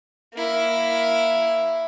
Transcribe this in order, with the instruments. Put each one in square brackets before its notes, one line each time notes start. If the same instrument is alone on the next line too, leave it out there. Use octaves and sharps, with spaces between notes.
[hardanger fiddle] A#3 E4